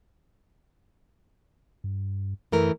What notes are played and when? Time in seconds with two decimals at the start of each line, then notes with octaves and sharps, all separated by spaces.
1.84 G2
2.52 F#2 E3 A3 A#4